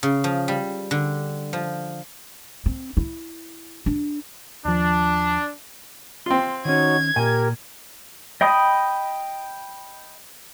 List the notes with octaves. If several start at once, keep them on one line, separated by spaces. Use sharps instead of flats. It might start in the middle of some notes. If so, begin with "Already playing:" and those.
C#3
F3
G3
D3
F3
C4
E4
D4
D#2 F3 D4
C4 F4 C6
D#3 C#4 D#4 F#4 C#5 G#6
A#2 G4 A#4 G#5
D#5 G5 B5 D#6